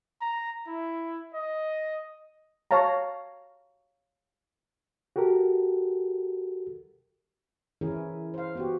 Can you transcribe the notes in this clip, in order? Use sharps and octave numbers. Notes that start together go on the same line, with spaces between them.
A#5
E4
D#5
C#5 F5 A5 A#5
F#4 G4 A4 A#4
E3 C#4 E4 G#4 A#4
C5 F5
B3 F#4 G4